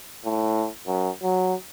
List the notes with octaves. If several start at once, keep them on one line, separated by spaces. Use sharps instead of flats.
A2
F#2
F#3